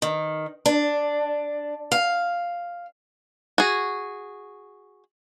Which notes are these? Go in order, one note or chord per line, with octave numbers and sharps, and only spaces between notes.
D#3
D4
F5
F#4 G#4